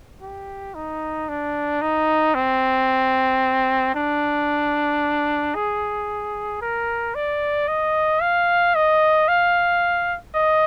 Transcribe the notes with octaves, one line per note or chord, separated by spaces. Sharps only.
G4
D#4
D4
D#4
C4
D4
G#4
A#4
D5
D#5
F5
D#5
F5
D#5